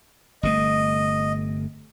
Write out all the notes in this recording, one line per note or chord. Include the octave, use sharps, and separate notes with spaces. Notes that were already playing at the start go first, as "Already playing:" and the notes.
G1 C3 A3 D#5